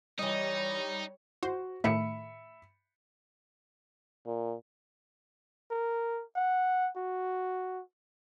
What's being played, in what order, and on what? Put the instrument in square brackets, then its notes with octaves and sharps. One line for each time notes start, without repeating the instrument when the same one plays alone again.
[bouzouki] E3 D#5 [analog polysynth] G3 [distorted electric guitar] D#4 [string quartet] C#5
[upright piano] F#4 [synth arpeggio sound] C5
[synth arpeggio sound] A2 D#3 A3 [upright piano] E5 B5 C#7
[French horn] A#2
[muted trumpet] A#4
F#5
F#4